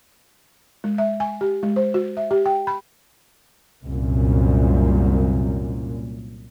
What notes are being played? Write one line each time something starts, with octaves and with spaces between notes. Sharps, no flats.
G#3
E5
G#5
G4
G#3
C5
F#4
E5
G4
G5
B5
C2 F#2 A#2